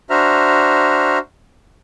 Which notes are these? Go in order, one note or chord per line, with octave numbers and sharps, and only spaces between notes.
D4 F#4 C5 E5 A#5 F6